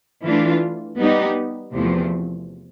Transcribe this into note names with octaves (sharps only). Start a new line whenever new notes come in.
E3 A3 D4 F4
G3 B3 D#4 G4
E2 C3 F3 A3 C4